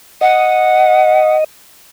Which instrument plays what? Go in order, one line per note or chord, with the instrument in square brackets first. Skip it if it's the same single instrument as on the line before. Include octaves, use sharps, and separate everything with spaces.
[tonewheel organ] D#5 [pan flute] F#5